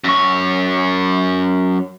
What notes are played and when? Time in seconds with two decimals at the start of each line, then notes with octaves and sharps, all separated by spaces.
0.04 F#2 C#5